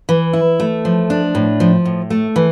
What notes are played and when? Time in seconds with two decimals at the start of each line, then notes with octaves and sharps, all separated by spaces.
0.09 E3
0.33 E4
0.60 A3
0.85 F3
1.10 D4
1.35 A2
1.60 F3
1.85 A2
2.10 A3
2.36 E3